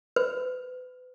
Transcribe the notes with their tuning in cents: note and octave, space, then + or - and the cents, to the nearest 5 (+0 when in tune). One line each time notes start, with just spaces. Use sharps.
B4 +35